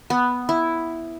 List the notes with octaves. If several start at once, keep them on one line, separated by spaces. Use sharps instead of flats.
B3
E4